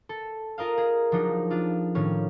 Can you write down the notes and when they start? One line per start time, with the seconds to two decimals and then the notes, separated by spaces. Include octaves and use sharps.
0.09 A4
0.58 F4 A#4 D#5 F5
0.77 G#4
1.12 F3 F#3 D4 D#4
1.51 D4 F4
1.95 A2 D#3 C#4